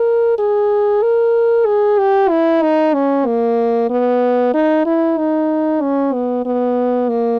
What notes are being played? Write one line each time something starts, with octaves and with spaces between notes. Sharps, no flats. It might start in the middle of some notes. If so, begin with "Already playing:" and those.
Already playing: A#4
G#4
A#4
G#4
G4
E4
D#4
C#4
A#3
B3
D#4
E4
D#4
C#4
B3
B3
A#3